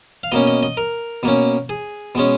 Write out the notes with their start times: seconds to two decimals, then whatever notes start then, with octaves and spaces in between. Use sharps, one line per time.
0.23 F5
0.32 B2 A#3 C#4 D#5
0.47 D#5
0.63 D#5
0.77 A#4
1.23 B2 A#3 C#4
1.69 G#4
2.15 B2 G#3 C#4